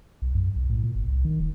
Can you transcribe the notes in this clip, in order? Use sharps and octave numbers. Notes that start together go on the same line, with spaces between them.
B1
F#2
B1
A2
A#2
G1
C2
D#3
D#1